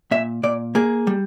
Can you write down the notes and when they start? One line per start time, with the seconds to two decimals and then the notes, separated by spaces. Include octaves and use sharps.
0.11 A#2 E5
0.43 A#2 D5
0.75 A#3 G#4
1.07 G3